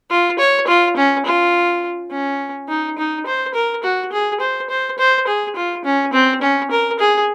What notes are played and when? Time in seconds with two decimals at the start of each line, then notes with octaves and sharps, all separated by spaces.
0.10 F4
0.39 C#5
0.68 F4
0.97 C#4
1.26 F4
2.11 C#4
2.69 D#4
2.98 D#4
3.26 C5
3.54 A#4
3.84 F#4
4.12 G#4
4.40 C5
4.70 C5
4.98 C5
5.27 G#4
5.56 F4
5.85 C#4
6.13 C4
6.42 C#4
6.71 A#4
7.00 G#4